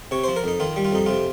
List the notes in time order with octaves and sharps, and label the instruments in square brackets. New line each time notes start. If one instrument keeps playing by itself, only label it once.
[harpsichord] C3 C#5
F3 C5
A#4
F2 D#4
D#3 F4
G3
F4
F2 D#4
C3 F4